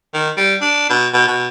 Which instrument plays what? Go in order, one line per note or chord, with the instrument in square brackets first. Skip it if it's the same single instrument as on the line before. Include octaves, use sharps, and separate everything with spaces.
[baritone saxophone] D#3
G3
D4
B2
B2
B2